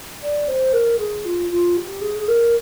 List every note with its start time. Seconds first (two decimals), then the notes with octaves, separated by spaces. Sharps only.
0.23 D5
0.48 C5
0.73 A#4
0.99 G#4
1.25 F4
1.51 F4
1.77 G4
2.02 G#4
2.20 G#4
2.28 A#4